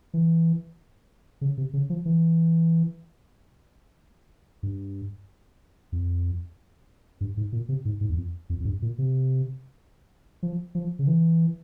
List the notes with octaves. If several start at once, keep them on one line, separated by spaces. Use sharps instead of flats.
E3
C#3
C3
C#3
F3
E3
G2
F2
G2
G#2
A#2
C3
G#2
G#2
E2
F2
F2
F2
G2
A#2
C3
F3
F3
C#3
E3